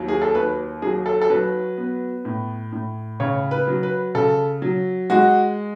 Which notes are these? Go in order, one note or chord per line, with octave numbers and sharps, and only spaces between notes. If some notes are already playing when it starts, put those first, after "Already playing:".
Already playing: D#2 F#3
G#4
A4
D#2 B4
F#3 G#4
A4
A4
F#3 B4
B3
A2
A2
C#3 C#5
B4
F#3
B4
C#3 A4
F#3
G#3 F#4